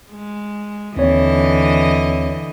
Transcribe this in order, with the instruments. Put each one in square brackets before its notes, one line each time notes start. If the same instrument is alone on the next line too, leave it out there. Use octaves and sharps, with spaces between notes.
[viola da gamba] G#3
[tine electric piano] D#2 C4 C#5 [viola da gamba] D3 E3 D#5